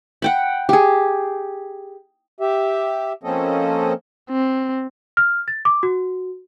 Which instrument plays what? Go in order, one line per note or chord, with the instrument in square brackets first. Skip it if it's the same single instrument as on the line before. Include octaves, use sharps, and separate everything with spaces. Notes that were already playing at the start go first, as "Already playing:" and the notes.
[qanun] F#5 G5 B5
G4 G#4
[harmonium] G4 E5
F3 A#3 C4 C#4 A4 D#5
[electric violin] C4
[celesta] F6
A6
D6
F#4